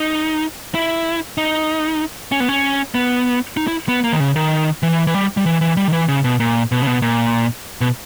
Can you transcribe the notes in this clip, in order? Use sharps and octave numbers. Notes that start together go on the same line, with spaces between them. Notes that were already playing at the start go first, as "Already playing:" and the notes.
Already playing: D#4
E4
D#4
C#4
B3
C#4
B3
D#4
E4
B3
A#3
D#3
C#3
D#3
E3
E3
G3
G3
E3
E3
G3
D#3
E3
C#3
B2
A#2
B2
C#3
B2
A#2
B2